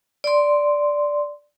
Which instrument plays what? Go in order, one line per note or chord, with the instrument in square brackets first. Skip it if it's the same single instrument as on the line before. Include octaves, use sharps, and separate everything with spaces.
[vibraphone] D5 C6